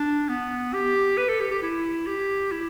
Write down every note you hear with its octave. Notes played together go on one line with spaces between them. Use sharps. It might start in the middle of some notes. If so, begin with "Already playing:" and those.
Already playing: D4
B3
G4
B4
A4
G4
G4
E4
G4
E4